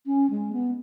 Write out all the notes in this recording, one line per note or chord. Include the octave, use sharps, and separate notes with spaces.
C#4
G#3
B3